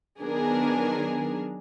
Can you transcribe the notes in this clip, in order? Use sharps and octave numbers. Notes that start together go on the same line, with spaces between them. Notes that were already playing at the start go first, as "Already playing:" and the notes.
D#3 F#3 B3 D4 G#4 A#4